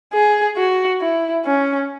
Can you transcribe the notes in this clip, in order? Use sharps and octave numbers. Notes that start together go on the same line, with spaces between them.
G#4
F#4
E4
C#4